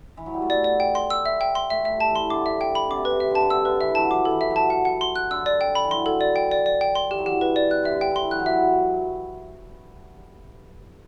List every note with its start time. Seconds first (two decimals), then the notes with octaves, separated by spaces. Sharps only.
0.17 E3
0.26 F#3
0.34 G3
0.42 A3
0.50 B3 D5
0.64 D5
0.80 G5
0.95 C6
1.10 E6
1.26 E5
1.41 G5
1.55 C6
1.70 A3 E5
1.85 G3 E5
2.00 A5
2.10 E3
2.16 C6
2.30 D3 D6
2.46 E5
2.61 G5
2.75 B5
2.86 D3
2.91 C3 D6
3.05 B4
3.10 C3
3.20 E5
3.31 D3 A5
3.41 D3
3.50 C3 E6
3.65 D3 B4
3.80 E3 E5
3.95 F#3 A5
4.11 E3 D6
4.25 A4
4.31 E3
4.41 E5
4.50 F#3
4.56 A5
4.70 F#5
4.85 F#5
5.01 C6
5.16 F#6
5.31 D3 E6
5.46 D5
5.61 G5
5.75 B5
5.84 E3
5.91 F#3 C6
6.06 A4
6.21 D5
6.36 G5
6.51 D5
6.66 D5
6.81 G5
6.95 C6
7.11 E3 G4
7.18 F#3
7.26 E3 G4
7.41 B4
7.56 D5
7.71 C3 F#6
7.83 C3 E5
7.91 D3
8.01 G5
8.11 E3 C6
8.31 F#3 F#6
8.40 E3
8.46 F#3 E5